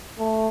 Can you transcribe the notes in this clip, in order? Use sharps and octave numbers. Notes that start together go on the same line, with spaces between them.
A3